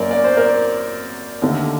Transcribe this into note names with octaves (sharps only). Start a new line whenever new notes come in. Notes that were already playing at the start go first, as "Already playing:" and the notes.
Already playing: F#2 F#3 A#3 A#4 D5
D5
C5
A#4 D5
D#2 D3 A3